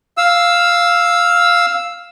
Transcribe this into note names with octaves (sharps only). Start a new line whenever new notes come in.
F5 E6